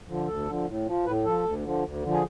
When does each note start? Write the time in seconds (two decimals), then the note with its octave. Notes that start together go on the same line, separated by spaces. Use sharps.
0.09 D3 F3
0.27 D2 A4
0.46 D3 F3
0.67 A2
0.86 F3
1.06 A2 B4
1.25 F3 A4
1.44 D2
1.63 D3 F3
1.84 D2
2.03 D3 F3
2.13 G#4